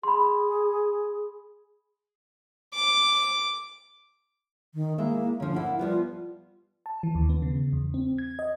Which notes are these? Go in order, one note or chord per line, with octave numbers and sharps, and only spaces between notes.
G#4 B5 C6
D6
D#3
G#3 A#3 E4 E5
D3 F3 C#4
A#3 E4 F#5
F3 G3 B3 F4
A5
E3
D#2
B3
C#3
E2
C4
G#6
D#5